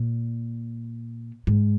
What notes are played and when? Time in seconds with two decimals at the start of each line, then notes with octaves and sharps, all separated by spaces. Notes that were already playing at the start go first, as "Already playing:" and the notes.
Already playing: A#2
1.47 G#2